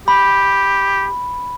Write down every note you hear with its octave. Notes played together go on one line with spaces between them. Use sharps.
G4 B5